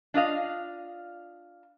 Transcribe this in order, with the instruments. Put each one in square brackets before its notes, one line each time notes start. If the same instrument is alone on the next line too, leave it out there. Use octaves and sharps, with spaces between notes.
[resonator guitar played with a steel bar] D4 F4 D#5 F5